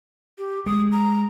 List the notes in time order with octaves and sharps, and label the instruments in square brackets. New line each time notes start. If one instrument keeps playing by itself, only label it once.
[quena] G4
[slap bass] G#3 [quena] D#6
[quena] A#5